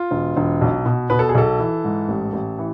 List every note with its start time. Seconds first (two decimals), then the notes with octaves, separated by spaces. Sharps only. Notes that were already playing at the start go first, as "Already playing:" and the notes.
Already playing: F4
0.11 E1
0.37 E1
0.61 B1
0.86 B2
1.10 B2 B4
1.19 A4
1.29 G#4
1.35 B1 A4
1.59 E3
1.85 G#2
2.08 A1
2.33 A1
2.58 E3